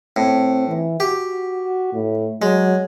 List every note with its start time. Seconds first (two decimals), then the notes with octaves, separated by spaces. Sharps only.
0.16 A2 C4
0.68 E3
1.00 F#4 G4
1.93 A2
2.42 F#3 G#3